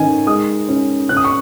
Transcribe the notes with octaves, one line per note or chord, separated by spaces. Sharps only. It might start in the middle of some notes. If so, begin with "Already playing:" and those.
Already playing: D#3 C#4 G#5
G#3 D#6
C#4
C#4 F#6
D#6
C#6